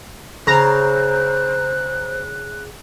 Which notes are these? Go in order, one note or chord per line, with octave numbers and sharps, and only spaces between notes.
C#3 C5 A#5 F#6